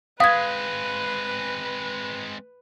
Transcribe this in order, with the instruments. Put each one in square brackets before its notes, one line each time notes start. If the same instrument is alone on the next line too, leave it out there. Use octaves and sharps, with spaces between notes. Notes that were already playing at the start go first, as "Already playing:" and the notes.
[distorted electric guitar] G#3 C4 [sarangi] B4 [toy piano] F5 [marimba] D#6 G#6